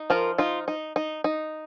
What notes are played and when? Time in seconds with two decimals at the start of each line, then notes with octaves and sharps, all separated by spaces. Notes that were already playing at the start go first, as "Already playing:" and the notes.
Already playing: D#4
0.10 F3 F4 A#4
0.38 D#4 F4
0.68 D#4
0.96 D#4
1.24 D#4